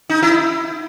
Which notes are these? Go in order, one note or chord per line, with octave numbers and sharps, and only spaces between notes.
D#4
E4